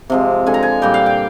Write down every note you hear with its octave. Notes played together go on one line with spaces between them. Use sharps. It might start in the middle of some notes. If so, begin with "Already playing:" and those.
C3 F3 G#3
D3 G#3 G#5
A#5
G#5
A#2 G3 G5
F5
G5